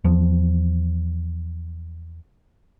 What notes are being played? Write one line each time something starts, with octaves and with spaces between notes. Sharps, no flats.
E2 F3